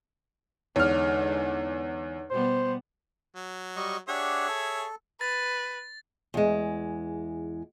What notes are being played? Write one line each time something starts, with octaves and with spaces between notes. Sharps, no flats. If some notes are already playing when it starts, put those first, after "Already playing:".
E2 D3 G#3 D#4 C#5 F6
B2 G3 B3 C5
F#3
G3 D#5 C#6
D4 G4 G#4 C#5 E5 F#5
A4
B4 A6
E2 G#3